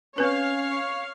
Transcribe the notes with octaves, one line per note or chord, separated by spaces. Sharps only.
C4 C#4 B4 C#5 F5